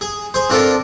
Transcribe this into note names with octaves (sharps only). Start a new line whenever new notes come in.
G#4
G#4 C5
C4 D4 F4 A4 A#4